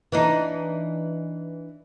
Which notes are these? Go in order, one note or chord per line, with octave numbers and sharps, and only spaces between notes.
E3 D4 D#4